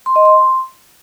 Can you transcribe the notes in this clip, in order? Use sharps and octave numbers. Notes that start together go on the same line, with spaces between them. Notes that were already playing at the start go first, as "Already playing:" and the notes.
C6
D#5
C6